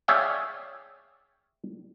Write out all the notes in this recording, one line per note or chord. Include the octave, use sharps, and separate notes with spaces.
G#4 C#5 D5 E5 F5 G5